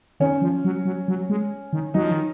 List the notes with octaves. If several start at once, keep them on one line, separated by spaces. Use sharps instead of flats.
D#3 C#4
F3
F#3
F#3
F#3
G#3
D#3
F#3 D#4
F3
D#3